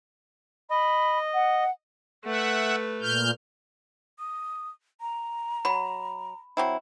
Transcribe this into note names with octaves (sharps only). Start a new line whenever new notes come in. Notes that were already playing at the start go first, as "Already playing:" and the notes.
D#5 B5
F#5
A3 B4 E5 F#5
A#2 F6 G6
D#6
A#5
F#3 B5
F#3 C4 E4